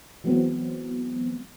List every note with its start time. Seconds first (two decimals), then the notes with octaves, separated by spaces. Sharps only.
0.24 E3 F#3 G#3 B3 C4